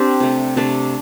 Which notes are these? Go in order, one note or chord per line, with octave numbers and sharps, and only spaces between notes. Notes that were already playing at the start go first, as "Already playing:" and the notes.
Already playing: C4 D4 G4
C3 A3
C3 A3 D4